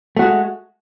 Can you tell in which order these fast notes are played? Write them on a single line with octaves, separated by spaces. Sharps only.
A3 F#4 G#3